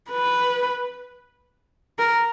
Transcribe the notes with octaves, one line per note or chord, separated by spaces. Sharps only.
B4
A#4